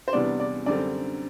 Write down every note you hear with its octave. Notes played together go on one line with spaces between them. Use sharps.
C5
E2 C3 G3 B3 D4 D5
D5
F#2 D3 G3 C4 D5